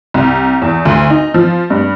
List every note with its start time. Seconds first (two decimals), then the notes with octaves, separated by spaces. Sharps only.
0.14 C2
0.62 E2
0.85 D2
1.10 D#4
1.34 F3
1.70 G2